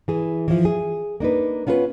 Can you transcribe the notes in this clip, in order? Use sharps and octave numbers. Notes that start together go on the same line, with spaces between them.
E3 G#4
E3 F3
G#4
A#3 D4 D#4 B4
B3 C#4 F4 A#4 B4